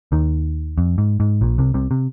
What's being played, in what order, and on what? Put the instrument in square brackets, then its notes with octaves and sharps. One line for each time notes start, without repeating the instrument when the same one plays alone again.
[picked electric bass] D#2 D#3
F2
G#2
G#2
A#1 A#2
C2 C3
C2 C3
C3